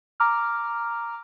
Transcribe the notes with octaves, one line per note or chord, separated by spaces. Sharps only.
A#5 D6 F6